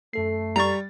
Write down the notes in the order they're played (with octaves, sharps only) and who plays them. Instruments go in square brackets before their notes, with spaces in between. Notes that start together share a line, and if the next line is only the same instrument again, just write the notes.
[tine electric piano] F#2 A4 C7 [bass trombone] A3
[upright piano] G3 A6 [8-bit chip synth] A#5 C#6